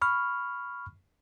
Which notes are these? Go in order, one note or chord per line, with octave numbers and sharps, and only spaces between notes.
B5 C#6 F6